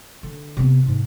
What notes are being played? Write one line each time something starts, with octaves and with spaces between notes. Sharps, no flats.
D3
C3 B3
G#2 C3